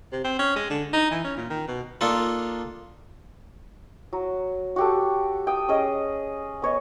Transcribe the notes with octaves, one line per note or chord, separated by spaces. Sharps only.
C3
C4
C#4
G#3
D3
D#4
E3
C#4
A#2
D#3
B2
A#3 D4 D#4 F4 A4
F#3
F#4 G4 A4
G5 D#6
C#4 G#4 D#5
B3 C#5 D#5